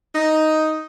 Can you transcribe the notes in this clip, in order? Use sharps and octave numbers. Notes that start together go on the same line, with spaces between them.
D#4